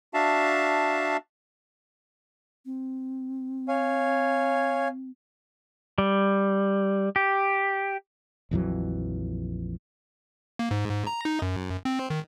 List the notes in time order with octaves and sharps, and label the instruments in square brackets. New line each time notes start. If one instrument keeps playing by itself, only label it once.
[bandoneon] D4 F#4 E5 F5 A5
[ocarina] C4
[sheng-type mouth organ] C#5 F5 G#5
[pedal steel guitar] G3
G4
[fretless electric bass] A#1 F2 E3 F#3
[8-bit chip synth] A#3
G#2
G#2
A#5
D#4
F#2
C4
D#3